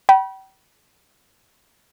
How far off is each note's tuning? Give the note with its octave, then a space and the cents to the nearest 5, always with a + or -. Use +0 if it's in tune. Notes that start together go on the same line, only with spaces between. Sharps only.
G5 -35 B5 -30